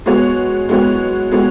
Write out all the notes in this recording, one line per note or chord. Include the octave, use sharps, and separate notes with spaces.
G#3 B3 F#4 C#5
G#3 B3 F#4 C#5
G#3 B3 F#4 C#5